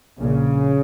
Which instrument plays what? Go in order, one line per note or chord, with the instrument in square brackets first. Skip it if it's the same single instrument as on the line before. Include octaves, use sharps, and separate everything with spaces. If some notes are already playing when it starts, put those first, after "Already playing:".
[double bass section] A#1 A#2 C#3